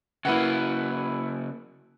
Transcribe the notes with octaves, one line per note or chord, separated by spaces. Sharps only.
C#3 A#3 E4 B4 F#5